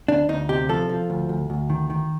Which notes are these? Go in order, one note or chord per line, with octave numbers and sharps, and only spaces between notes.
D2 D4
D2 D#4
C3 G4
F3 A4
F3
D2
D2
D2
D#3
D#3